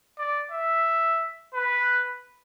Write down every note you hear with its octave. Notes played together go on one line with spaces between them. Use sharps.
D5
E5
B4